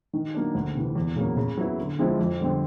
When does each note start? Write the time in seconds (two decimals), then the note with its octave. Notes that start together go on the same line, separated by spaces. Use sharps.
0.13 D#3
0.34 F#3 A#3 D4
0.55 D2
0.75 C3 E3
0.95 E2
1.16 C#3 F#3 A#3
1.37 C#3
1.57 F#3 B3 E4
1.78 D3
1.99 F3 G#3 C4 E4
2.19 F2
2.39 D3 G3 C4